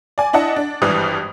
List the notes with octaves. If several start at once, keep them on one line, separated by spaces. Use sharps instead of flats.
D5 G#5
D4 E4 D#5 F#5 A5
D4
G#1 G2 E3 G3 D#6